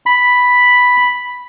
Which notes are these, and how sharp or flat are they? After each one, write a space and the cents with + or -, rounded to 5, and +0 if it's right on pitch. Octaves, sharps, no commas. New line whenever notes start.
B5 +0